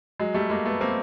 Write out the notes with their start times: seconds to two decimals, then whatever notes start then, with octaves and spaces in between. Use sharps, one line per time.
0.20 F#3 G#3
0.34 G3 A3
0.50 G#3 A#3
0.66 A3 B3
0.80 A#3 C4